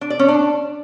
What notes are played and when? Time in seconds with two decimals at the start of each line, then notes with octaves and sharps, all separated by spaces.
0.01 D4
0.10 D5
0.19 C#4
0.28 D4